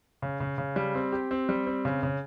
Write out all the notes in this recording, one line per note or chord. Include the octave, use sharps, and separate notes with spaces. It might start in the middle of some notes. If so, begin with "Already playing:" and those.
C#3
C#3
C#3
G3
C4
G4
C4
G3
C4
C#3
C#3